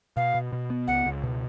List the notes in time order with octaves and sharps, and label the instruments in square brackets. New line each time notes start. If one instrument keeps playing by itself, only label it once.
[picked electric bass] B2 [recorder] F5
[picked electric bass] B2
B2
B3
[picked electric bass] C#2 [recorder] F#5
[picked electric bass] C#2
B2